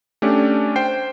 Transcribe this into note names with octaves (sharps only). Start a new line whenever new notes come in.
A3 C#4 D4 G4
C5 G5 C7